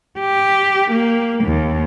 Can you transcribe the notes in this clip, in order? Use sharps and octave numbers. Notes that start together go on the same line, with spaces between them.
G4
A#3
D#2